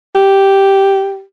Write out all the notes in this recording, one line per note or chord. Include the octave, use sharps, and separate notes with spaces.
G4